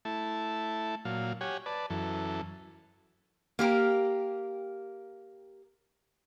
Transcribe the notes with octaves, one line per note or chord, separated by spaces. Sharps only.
A3 E4 A5
A#2 F#3 F5
G4 C#5 F#5 G#5
B4 D5 A5
F#2 E3 A4
A#3 G4 A#4